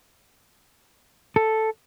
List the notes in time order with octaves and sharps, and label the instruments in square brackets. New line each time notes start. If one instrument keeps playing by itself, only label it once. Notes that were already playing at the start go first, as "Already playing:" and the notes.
[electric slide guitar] A4